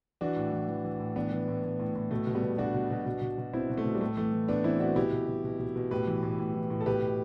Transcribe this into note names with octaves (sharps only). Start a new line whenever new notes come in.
E3 D4 F#4
A2
E3
E3
E3
A2
E3 B3 D4
E3
A2
A2
A2
A2
B2 A3
B2
G3 B3
B2
B2 D4 F#4
B2
B2
B2
B2
B2
B2 C4 E4
B2
A3
B2
G3
A2 A3
E3 A3
E3
A2 B3 D4
E3 C4 E4
E3 D4 F#4
B2 E4 G4
B2
B2
B2
B2
B2
A2 G4 B4
E3
A2
A2
E3
A2
A4
B2 G4 B4
B2